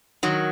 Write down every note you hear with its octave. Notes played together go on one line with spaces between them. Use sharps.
D#3 F#3